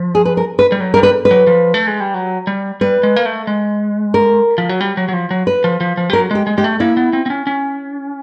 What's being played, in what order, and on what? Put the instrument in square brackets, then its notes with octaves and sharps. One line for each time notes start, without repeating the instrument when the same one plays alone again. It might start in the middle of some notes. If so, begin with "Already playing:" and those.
Already playing: [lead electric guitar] F3
[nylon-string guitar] G#4
B4
A#4
B4
[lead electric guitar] G3
F#3
[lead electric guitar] G3 [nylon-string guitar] A#4
[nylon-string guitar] B4
B4
[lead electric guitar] F#3
F3
A3
G#3
G3
F#3
G3
[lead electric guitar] G3 [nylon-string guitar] B4
[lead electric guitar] G#3
A#3
A3
G#3
[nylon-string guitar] A#4
[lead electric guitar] F3
F#3
G3
F#3
F#3
F3
F#3
[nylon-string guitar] B4
[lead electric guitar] F3
F3
F3
G3
[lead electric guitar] F#3 [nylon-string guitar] A#4
[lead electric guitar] G#3 [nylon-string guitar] G4
[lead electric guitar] G#3
[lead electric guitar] G#3 [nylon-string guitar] G4
[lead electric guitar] A3
[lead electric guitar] A#3 [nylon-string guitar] E4
[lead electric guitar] B3
C4
C4
C#4
C#4